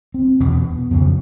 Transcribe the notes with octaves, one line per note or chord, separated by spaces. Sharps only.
C4
E2 B2 B3
F2 C#3